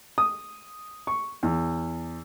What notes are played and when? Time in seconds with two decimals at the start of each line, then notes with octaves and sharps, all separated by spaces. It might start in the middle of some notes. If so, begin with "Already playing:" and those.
0.18 D#6
1.07 C#6
1.43 E2